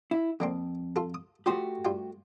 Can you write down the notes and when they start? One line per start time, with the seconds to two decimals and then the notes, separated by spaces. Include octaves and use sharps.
0.11 E4
0.40 F2 D3 A#3 C4
0.96 F4 A4
1.14 D#6
1.46 F3 A3 F#4 G4 C6 D#6
1.85 G2 F4 G5